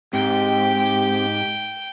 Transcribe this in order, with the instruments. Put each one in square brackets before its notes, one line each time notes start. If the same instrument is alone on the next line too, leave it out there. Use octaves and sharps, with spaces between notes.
[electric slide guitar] G#2 [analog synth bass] C4 [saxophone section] G4 [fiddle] G5